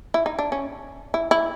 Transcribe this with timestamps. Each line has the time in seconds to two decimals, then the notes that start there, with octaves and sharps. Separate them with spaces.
0.14 E4
0.26 D#4
0.39 D4
0.52 C#4
1.14 E4
1.31 E4